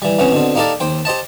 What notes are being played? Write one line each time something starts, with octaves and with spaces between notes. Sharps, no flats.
E3 G3
C3 E3 B3 C#4
B2 D3 C4
A#3 D#4 G4 A4 A#4 D5
D#2 C5 G5
G4 C5 D#5 A5